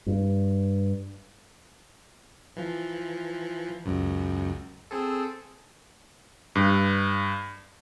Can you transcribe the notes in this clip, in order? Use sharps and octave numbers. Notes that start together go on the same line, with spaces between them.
G2
E3 F3
C#2 F#2
C4 G#4 A4
G2